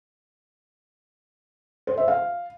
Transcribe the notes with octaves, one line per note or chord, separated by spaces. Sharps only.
C5
E5
F5